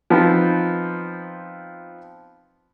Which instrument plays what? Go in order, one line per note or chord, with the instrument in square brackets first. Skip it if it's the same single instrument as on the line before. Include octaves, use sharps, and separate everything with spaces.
[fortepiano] F3 B3 C4 D#4